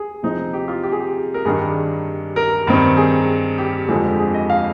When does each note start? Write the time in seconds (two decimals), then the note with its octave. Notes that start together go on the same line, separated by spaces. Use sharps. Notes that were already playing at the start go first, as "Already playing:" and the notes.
Already playing: G#4
0.23 C3 F3 C4 D#4
0.53 G4
0.68 F4
0.83 G4
0.92 G#4
1.00 G4
1.34 A#4
1.45 G2 D#3 G3 D4 G#4
2.36 A#4
2.67 G2 D#3 G3 C4
2.97 G#4
3.58 G4
3.88 F2 D3 F3 G#3
4.19 G#4
4.34 D#5
4.50 F5